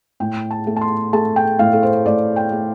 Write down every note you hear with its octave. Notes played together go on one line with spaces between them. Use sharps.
A2 G5
A5
A3
A5
C6
A3 A5
G5
A2 F5
A4
C5
A2 D5
G5
A3